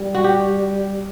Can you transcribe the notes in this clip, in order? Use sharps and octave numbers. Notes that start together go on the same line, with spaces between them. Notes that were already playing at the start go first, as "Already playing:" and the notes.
Already playing: G3
F#4
G4